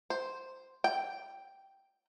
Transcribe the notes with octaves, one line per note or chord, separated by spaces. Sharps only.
C5
G5